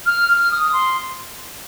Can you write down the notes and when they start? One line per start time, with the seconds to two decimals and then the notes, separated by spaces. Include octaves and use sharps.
0.06 F6
0.29 F6
0.51 D#6
0.73 C6